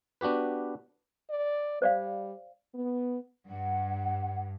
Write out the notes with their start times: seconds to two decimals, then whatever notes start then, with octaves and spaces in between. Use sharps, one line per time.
0.21 B3 D4 F#4 G4 B4
1.30 D5
1.82 G3 C5 D5 F5
2.75 B3
3.47 G2 F#5